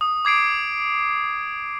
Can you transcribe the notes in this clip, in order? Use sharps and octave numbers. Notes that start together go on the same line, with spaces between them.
D#6
D6 G#6 C7 D7